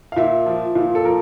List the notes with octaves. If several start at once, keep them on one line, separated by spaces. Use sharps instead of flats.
F5
A#2 E5
F3
A#2
A4
F3 A#4